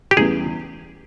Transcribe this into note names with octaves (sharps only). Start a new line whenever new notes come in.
G4
E2 C#3 E3 G3 B3 G#4